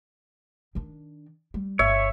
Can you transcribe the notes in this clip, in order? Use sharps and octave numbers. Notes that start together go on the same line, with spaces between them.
D#3 D4
G3
G1 C#5 E5